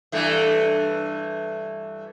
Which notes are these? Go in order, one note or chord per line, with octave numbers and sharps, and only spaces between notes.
G2 E3 A3